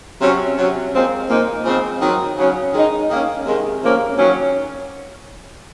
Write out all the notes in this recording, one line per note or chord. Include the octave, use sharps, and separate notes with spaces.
C3 F#3 C#4
C3 F#3 C#4
A#2 F3 G#3 C4
A#2 F3 A#3 D#4
C#3 F3 G#3 C4
D#3 F#3 C4
C#3 F#3 C#4
D#3 G#3 D#4
D#3 A#3 C#4
C3 D#3 G#3
C3 F3 A#3 C#4
D#3 F#3 C#4